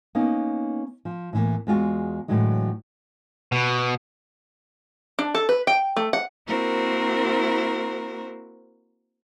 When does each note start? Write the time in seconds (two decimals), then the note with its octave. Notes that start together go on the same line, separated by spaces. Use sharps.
0.15 A#3 B3 C#4 D#4
1.05 F3
1.33 A2 E3 A#3
1.67 E2 G#3 F4 F#4
2.28 A2 D3 E3 F#3 G#3
3.52 B2
5.19 D4
5.35 A4
5.49 B4
5.67 G5
5.97 A3
6.13 F#5
6.47 A#3 C4 E4 F#4 A#4 C5